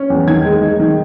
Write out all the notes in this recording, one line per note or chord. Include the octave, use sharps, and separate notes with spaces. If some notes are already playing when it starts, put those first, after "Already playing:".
Already playing: C#4
E2
D#3 G#6
G#3
D#4
D#3